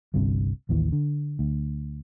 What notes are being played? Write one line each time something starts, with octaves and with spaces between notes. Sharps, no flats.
G1 C2 G2 C3
A1 D#2 E3
D3
D2